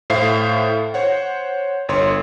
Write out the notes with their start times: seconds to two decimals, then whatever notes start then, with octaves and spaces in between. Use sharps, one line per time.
0.10 A2 C5 E5 F5 C7
0.94 C5 C#5 F#5
1.89 G1 C#5 C6